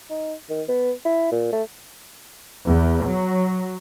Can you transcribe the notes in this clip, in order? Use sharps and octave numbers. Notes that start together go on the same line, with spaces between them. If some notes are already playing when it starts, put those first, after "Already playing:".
D#4
D#3
B3
E4
A#2
A3
E2
F#3